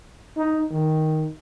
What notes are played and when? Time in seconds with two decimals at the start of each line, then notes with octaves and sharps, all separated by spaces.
0.37 D#4
0.71 D#3